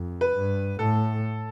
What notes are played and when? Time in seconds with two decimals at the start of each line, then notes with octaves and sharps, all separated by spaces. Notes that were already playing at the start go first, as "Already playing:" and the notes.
Already playing: F2
0.21 B4
0.35 G2
0.79 A2 A4